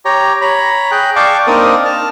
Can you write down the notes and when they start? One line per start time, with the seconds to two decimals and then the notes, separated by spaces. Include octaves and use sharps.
0.05 G4 C#5 A#5
0.41 C#5 A#5 B5
0.91 G#4 G5 F#6
1.16 D5 F5 G5 A5 C#6 D6
1.47 A#3 C4 D4 D#4 A#4 D#6
1.85 A5 F6